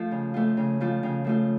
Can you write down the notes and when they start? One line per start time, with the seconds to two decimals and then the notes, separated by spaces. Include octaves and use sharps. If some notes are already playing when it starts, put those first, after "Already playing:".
Already playing: F3 A3 F4
0.11 C#3
0.34 F3 A3 F4
0.57 C#3
0.81 F3 A3 F4
1.03 C#3
1.24 F3 A3 F4